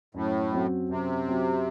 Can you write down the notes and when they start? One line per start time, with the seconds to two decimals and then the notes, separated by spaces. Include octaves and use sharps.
0.14 F#2 A2
0.52 F#3 C4 F#4
0.89 F#2 C3
1.26 F#3 C4 F#4